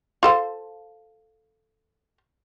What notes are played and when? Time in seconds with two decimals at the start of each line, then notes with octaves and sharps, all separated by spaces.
0.23 F4 A4 C5